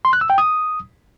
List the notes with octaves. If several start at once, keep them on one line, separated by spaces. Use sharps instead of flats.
C6
F#6
E6
G5
D#6